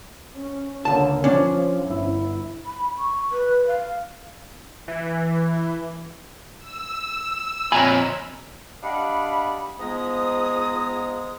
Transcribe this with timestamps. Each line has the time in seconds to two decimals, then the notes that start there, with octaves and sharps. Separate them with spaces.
0.36 C#4
0.85 C#2 D3 A#3 A5
1.24 F3 C#4 D4
1.85 G1 E4
2.66 B5
2.98 C#6
3.32 B4
3.67 F5
4.88 E3
6.58 E6
7.72 F2 A#2 C#5 G#5 A#5 B5
8.82 D4 G4 D#5 F5 F#5 B5
9.79 G#2 F3 G#3 B3 A#5 D#6